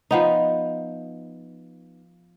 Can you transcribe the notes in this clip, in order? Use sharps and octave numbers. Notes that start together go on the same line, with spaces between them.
F3 B3 D#4